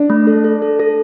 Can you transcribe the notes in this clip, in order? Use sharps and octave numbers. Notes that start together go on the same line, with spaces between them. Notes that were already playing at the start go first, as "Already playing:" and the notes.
Already playing: D4
A3
A4
A4
A4
A4